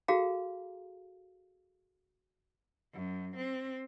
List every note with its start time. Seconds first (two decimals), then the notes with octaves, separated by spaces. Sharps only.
0.08 F#4 G#4 A4 F5 A#5
2.93 F#2
3.36 C4